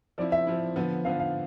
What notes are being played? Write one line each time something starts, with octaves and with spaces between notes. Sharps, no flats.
F3 C4 E4 D5
E5
F3 C4 E4
D3 F3 B3
D3 F3 B3 F5
F5